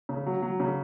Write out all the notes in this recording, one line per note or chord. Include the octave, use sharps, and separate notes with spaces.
C#3
F#3
F#3
C#3